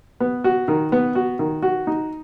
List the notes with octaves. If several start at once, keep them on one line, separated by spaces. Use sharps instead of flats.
B3
F#4
D#3
B3
F#4
D#3
F#4
D#4